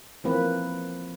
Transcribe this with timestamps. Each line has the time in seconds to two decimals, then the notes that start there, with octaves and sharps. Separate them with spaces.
0.24 E3 F3 A#3 C4 B4